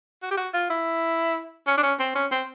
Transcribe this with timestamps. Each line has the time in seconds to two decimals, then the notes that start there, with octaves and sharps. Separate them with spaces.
0.23 F#4
0.31 G4
0.37 F#4
0.54 F4
0.70 E4
1.67 C#4
1.78 D4
1.83 C#4
1.99 C4
2.15 C#4
2.31 C4